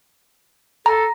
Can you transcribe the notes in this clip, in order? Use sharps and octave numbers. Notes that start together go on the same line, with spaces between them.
A4 A#5